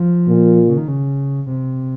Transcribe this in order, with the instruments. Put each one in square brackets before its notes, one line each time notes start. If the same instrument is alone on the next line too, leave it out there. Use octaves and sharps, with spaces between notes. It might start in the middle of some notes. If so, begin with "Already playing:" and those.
Already playing: [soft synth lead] F3
[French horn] A#2
[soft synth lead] C#3
D#3
C#3
C3